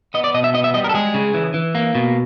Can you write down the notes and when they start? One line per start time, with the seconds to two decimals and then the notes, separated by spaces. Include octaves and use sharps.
0.14 B3 D#5
0.24 D5
0.34 B2 D#5
0.44 E5
0.54 B3 D#5
0.64 E5
0.74 G3 D#5
0.84 A#4
0.89 A4
0.94 G#3 G#4
1.14 C#3
1.34 E3
1.54 E3
1.75 A#3
1.95 B2